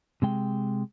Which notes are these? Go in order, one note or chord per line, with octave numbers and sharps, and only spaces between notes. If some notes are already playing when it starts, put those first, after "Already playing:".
C3 G#3 G5